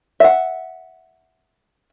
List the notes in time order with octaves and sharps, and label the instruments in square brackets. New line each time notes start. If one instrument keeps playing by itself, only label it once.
[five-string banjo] E5 F#5